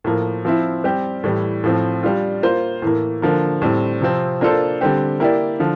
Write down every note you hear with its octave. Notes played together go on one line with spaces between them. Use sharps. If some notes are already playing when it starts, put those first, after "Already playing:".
A2 F3 A#3
F3 C4 E4
G3 C4 G4
A2 E3 G3
A2 F3 C4
G3 D4 F4
A#3 F4 C5
A2 E3 A#3
D3 F3 A#3
A2 G3 C4
C3 F3 C4
A#3 D4 F4 A4 C5
D3 G3 C4 G4
A#3 E4 G4 D5
D3 F3